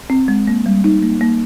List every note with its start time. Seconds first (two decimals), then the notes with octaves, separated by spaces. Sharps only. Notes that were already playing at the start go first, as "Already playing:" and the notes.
0.10 C4
0.28 G#3
0.48 A#3
0.66 G3
0.84 D#4
1.03 A#3
1.21 A#3